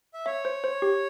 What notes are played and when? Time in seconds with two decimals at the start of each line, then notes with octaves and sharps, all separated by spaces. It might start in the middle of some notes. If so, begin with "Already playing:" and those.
0.14 E5
0.26 C#5 E5
0.45 C5
0.64 C5
0.82 G4